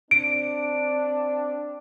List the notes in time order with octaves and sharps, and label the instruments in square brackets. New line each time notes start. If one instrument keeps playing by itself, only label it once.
[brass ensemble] C4 D4 [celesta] D7